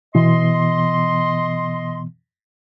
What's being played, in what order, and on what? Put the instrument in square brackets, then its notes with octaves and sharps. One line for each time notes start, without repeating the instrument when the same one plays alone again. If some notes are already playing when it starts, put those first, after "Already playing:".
[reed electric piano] B2 E3 B3 [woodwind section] D#5 C6